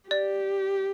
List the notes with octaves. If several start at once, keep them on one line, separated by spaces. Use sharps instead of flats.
G4 D5